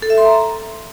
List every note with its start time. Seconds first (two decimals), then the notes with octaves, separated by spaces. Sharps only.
0.02 A4
0.10 E5
0.18 C6
0.25 A#5